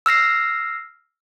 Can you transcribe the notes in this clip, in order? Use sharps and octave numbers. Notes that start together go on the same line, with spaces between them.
E6 F6 A#6 C7